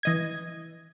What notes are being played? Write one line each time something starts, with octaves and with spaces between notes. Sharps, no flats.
E3 D#5 G#6